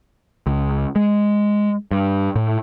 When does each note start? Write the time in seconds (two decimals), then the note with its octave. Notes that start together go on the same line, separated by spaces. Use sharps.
0.46 C#2
0.96 G#3
1.91 G2
2.36 A2